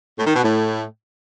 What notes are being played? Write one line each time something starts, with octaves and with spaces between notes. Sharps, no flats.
A2
D#3
B2
A2